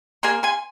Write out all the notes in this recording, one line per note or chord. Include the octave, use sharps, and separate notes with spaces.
A#3 G#5 C6
G#5 C6